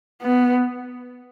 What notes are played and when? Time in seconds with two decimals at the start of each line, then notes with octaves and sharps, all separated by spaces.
0.22 B3